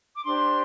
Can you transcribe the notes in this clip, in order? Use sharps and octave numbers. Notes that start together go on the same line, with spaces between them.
D6
D4 G4 C5 C6